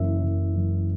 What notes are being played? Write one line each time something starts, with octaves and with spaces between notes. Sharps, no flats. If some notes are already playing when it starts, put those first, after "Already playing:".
Already playing: F#1 F#2 E3 E5
F#1
F#2 E3